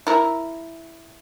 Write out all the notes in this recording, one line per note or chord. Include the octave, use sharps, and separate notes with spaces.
E4 A#4